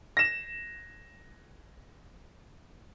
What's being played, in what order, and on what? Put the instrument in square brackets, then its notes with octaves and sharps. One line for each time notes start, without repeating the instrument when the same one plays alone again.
[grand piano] A#6 E7